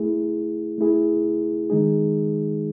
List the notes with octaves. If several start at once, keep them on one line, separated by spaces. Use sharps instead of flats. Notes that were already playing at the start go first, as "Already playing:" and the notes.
Already playing: A3 E4 G#4
A3 E4 G#4
D#3 G#3 D#4 G#4